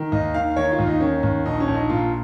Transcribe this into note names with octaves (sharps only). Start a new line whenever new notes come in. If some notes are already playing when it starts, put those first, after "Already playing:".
Already playing: D#3
D#2 D#5
D#3 F5
D#3 C#5
F4
D#2
D#4
D#3 C#4
D#2
A#1 D#4
C#4
A#1
D#4
A#2 F4